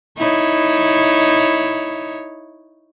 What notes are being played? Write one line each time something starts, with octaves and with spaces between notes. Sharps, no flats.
D#4 E4 C#5